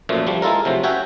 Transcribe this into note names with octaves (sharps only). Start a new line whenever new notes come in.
F#2 A#2 F3 A3
F3 G3 D4
G#3 E4 F4 A4 A#4
C3 F3 F#3 A3
C#4 F#4 C#5 E5 G5